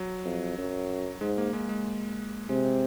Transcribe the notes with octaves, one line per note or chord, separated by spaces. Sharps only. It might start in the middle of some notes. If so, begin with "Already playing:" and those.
Already playing: F#3
F2
F#2
G#2 G#3
A#3
G#3
G#3
C3 G#3